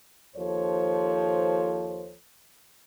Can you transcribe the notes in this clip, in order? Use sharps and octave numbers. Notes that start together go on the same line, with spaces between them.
D#2 F3 A4 C5 C#5